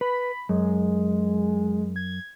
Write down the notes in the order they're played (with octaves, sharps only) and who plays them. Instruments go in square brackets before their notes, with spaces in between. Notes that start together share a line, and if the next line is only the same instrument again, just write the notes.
[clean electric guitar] B4 [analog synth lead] B5
[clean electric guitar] F#2 [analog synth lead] G#3
[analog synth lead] G#6